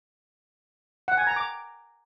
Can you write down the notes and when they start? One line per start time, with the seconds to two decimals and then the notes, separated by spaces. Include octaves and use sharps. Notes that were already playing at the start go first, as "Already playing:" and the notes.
1.08 F#5
1.17 G#5
1.27 A#5
1.36 D6